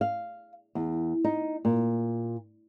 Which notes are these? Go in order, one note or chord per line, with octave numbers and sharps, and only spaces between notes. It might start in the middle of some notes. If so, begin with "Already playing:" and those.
F5
E2
D#4
A#2